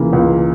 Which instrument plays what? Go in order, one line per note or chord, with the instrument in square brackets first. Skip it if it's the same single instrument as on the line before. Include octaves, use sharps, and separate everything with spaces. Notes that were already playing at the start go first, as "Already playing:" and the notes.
Already playing: [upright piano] C#2 C#3 E3 A#3
C#2